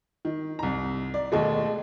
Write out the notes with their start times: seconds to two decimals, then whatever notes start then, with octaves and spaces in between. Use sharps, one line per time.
0.25 D#3
0.59 C2 A#5
1.14 D5
1.32 D#2 B2 G#3 A3